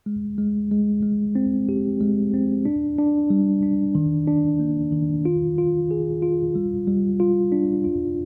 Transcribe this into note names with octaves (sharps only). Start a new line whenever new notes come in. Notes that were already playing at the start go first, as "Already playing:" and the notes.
G#3
G#3
G#3
G#3
C4
G4
G#3
C4
D4
D4
G3
D4
D#3
D4
A#3
D#3
F4
F4
G#4
F4
G3
G3
F4
D4
F4